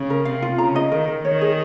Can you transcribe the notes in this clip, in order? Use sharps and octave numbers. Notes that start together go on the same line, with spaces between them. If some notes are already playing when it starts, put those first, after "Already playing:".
Already playing: C#3
A#4
C3 F5
F4
C#3 A#5
D#5
D#3 A#4
A#4
D#3 C#5
G#4